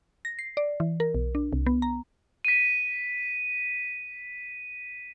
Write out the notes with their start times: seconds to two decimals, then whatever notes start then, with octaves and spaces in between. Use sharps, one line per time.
0.25 A#6
0.39 C7
0.57 D5
0.80 E3
1.00 A#4
1.15 B1
1.35 D4
1.53 C2
1.66 B3
1.82 A#5
2.45 B6 D#7